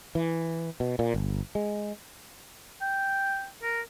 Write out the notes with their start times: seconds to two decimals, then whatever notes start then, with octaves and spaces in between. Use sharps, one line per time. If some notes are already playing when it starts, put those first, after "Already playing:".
0.15 E3
0.80 B2
0.99 A#2
1.14 G1
1.55 G#3
2.81 G5
3.63 A#4